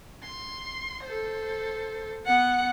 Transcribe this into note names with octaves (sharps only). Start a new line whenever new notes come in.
C6
A4 C5
B3 F#5 C#7